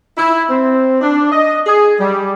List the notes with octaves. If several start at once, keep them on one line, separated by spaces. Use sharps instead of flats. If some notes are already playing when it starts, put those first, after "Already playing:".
E4
C4
D4
D#5
G#4
G3